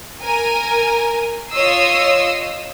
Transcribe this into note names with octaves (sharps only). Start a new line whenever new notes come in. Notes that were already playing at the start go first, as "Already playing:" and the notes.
A#4 G#5
F4 C#5 D#5 D#6 E6 C7